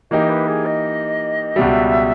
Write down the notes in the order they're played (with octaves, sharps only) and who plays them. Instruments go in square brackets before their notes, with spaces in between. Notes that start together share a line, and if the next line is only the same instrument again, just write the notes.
[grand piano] E3 A#3 D#4 G4 [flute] D#5
[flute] B4
G#4
D#5
[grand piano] C#2 B2 G3 [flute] E5